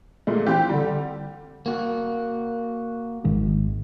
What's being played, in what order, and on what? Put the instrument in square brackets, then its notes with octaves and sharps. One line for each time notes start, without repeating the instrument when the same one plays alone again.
[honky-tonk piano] A#2 G#3 A3
[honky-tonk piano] E3 G4 [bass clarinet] C4
[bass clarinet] D3 [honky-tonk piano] G3
[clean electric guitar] A#3 F#4
[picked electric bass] G#1 D#3 G#3